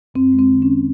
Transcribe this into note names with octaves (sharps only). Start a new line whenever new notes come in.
F#2 C4
G#3
C4
D#3
C#4